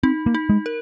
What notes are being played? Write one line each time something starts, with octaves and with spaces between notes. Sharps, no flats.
C4 D#4
A#3
D#4
G#3
A#4